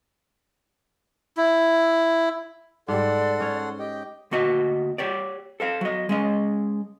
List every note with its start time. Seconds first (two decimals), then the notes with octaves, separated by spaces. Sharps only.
1.37 E4
2.88 G#2 G3 A4 D5 F#5 C6
3.40 C#4 C#5
3.79 G4 D#5 G5
4.31 D2 A#3 F#4 D#5
4.98 G4 C#5 D5
5.60 A4 C5 F5
5.81 F#3 D#5
6.09 G#3 C#4 D#5